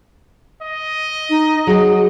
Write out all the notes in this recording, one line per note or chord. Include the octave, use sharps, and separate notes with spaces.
D#5
D#4
F#3 G#4